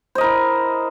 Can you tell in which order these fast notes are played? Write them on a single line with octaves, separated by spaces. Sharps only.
C5 D#5 A#4 E4